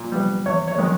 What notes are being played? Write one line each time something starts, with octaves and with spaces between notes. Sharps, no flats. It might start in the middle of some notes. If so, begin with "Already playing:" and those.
Already playing: A#2
G3 B3
E2 C#5
C#5
D#3 G#3 B3